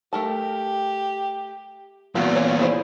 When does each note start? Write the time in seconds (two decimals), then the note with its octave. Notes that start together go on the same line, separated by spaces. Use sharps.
0.13 A3 G4 A#4 A5
2.15 E2 A#2 G3 A3 F4 F#4
2.36 C#5 F5
2.59 E4 G#4 C5